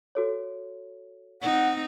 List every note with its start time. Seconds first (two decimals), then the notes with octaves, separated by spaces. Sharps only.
0.15 F#4 A4 C#5
1.42 C4 D#4 F#5